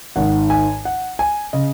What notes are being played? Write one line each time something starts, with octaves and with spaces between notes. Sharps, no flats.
G#1 G#2 D#3 F#5
G#5
F#5
G#5
C#3 D#5